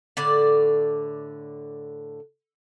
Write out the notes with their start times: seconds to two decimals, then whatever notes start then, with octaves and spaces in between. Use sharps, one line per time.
0.17 A2 D3 D5